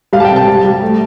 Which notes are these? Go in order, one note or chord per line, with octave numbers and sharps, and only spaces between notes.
G3 F5
A5
G5
C3
A5
G3
G3
A3